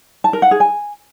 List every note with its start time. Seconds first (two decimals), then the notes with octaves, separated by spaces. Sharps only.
0.24 A5
0.33 A#4
0.42 F#5
0.51 G#4
0.60 G#5